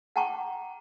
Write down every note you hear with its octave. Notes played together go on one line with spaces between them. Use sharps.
F#5 G5 A5 A#5 C#6 D6